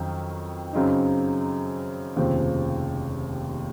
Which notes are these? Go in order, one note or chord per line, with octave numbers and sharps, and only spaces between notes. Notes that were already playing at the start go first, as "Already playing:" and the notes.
Already playing: F2 D#3 F#3 C#4
F#2 C#3 F#3 C4 D#4
F1 D#2 C#3 F3 C4